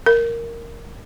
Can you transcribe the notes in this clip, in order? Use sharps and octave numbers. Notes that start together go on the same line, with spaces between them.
A#4